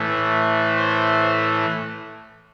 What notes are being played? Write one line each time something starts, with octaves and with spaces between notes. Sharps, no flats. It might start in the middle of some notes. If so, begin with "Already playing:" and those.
Already playing: A2 E3 A3
C5